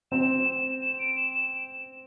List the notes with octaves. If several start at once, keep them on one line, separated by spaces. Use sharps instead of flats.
C4 E7
E7
D7
E7
E7